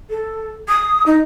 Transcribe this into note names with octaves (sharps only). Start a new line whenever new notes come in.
A4
D#6
D#4